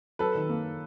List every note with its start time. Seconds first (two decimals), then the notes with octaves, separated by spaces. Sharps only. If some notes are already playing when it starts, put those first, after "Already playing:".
0.19 F#3 A4 B4
0.35 D#3
0.49 A#3